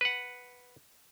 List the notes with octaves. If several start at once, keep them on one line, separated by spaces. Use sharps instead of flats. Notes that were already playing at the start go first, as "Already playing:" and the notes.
B4 F#5